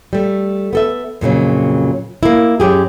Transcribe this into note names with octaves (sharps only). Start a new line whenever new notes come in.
G3 A3
B3 A4 E5
F2 A#2 C#3 F#3
A#3 E4
F#2 G4 G#4